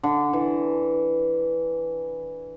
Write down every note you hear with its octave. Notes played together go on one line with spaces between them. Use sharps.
D3
E3